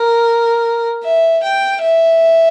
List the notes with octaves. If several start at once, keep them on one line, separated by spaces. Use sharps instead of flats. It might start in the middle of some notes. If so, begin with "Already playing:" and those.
Already playing: A#4
E5
G5
E5